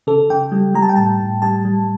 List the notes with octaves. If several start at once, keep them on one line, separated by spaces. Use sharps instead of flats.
C#3 A4
C#3 G5
G3
G3 A#5
A5
G5
A2 A5
A2
G3 A5
G3